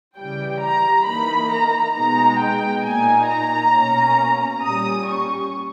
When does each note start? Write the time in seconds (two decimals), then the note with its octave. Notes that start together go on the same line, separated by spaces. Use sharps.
0.16 C#3 E3 G3 G5
0.61 A#5
1.06 E3 A#3 D#4 B5
1.51 A#5
1.95 B2 G#3 B3 D#4 A#5
2.39 G5
2.84 A#2 A#3 D#4 G#5
3.28 A#5
3.73 B2 A#3 C#4
4.63 A#2 G3 C#4 D#6
5.07 C#6